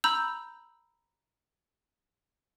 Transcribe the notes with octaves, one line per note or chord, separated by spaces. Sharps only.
A#5 B5 E6 G6